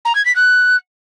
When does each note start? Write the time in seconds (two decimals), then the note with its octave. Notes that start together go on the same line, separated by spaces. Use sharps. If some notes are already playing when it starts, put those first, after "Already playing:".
0.05 A#5
0.15 G#6
0.25 B6
0.35 F#6